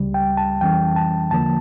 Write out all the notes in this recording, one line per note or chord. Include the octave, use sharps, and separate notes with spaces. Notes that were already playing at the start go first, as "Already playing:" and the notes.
Already playing: C#2 C#3 G3
G5
A5
F2 E3 G3 C#4 G5
A5
E2 D3 F3 A#3 A5